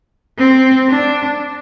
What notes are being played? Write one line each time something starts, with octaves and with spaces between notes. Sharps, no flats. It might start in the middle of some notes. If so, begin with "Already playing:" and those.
C4
D4